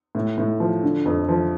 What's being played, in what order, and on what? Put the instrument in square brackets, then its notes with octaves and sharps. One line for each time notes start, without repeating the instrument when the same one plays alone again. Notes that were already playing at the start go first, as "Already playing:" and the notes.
[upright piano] A2
A2
F3
D3
F2
F3